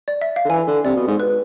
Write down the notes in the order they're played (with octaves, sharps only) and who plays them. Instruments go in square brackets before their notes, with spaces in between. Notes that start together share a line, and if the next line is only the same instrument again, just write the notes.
[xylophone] D5
E5
F5
[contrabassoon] D3
[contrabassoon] E3 [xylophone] G#5
[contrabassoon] D3
[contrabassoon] C3 [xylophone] D5
[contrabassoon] B2
G#2
[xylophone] B4